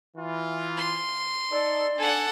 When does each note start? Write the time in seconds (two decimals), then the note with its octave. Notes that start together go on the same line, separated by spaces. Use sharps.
0.17 E3 F4
0.77 C6
1.51 D#4 A4 D5
1.98 D4 A4 F#5 G#5